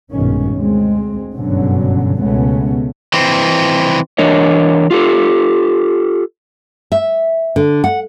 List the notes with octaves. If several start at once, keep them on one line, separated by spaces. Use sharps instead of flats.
A#1 G2 B2 D#3 G#3 C#4
D2 G#3 C4
F#1 G2 B2 D3 F#3 C#4
C#2 B2 G#3 A3 B3 C#4
E3 C4
E3 D4 A#4 C#5 D#5
F4 G4 A4
E5
D3
F#5